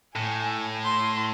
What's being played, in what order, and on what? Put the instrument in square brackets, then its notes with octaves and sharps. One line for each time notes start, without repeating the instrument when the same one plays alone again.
[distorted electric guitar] A2 [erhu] G#5
[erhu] C6